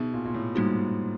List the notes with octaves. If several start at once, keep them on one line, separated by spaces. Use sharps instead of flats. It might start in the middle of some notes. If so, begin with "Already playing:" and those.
Already playing: B2 B3 D#4 G#4 E5
A#2
A#2
A2
G#2 G3 A#3 D#4 F#4